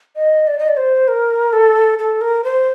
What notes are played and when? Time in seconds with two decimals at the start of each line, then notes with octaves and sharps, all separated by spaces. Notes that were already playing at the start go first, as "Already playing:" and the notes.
0.16 D#5
0.47 D5
0.59 D#5
0.68 D5
0.77 C5
1.08 A#4
1.53 A4
1.99 A4
2.21 A#4
2.44 C5